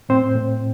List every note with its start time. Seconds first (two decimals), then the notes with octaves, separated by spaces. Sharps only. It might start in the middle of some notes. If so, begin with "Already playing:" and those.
0.09 A2 C4 C5
0.36 A2